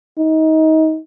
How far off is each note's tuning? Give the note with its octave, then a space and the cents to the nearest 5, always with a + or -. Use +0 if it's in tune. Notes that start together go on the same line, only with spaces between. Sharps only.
D#4 +25